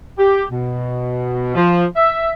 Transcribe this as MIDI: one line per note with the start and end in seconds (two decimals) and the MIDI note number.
0.18 0.43 67
0.49 1.54 47
1.55 1.83 53
1.95 2.32 76